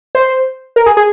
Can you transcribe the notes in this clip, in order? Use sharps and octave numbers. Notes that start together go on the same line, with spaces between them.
C5
A#4
G#4
G#4